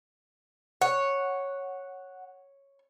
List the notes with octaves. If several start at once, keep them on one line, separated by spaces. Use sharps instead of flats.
C#5 F#5